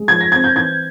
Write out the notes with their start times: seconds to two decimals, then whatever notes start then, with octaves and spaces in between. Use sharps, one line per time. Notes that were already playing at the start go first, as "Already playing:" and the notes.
Already playing: G#3
0.08 F3 G#6
0.21 A#6
0.32 C4 G#6
0.44 G6
0.55 E3 G#6